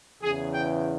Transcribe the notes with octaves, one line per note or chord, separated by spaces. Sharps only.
E2 C#3 E3 G#4
G5